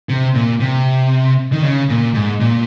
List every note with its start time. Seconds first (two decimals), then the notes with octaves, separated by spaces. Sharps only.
0.09 C3
0.35 A#2
0.61 C3
1.52 D#3
1.63 C#3
1.90 A#2
2.15 G#2
2.40 A#2